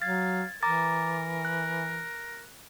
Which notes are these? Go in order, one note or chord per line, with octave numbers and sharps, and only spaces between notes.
F#3 F5 G#6 A6
E3 A#4 A#5 D6 A6
F#6